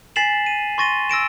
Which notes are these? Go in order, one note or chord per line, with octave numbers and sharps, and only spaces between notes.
G#5 A6 B6 C7 E7 F#7
D#7
C6 C#6 A6 A#6 D#7 G7
E6 A#6 D7 E7